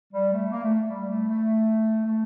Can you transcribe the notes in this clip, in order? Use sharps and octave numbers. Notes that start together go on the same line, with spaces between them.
G3
A3
A#3
A3
G3
A3
A3
A3